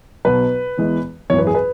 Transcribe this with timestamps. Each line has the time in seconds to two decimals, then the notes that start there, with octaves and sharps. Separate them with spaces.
0.25 B1 B2 F#3 B4
0.78 E2 E3 G#3
1.30 G#1 F#2 E3 C#5
1.38 B4
1.47 G#4
1.55 B4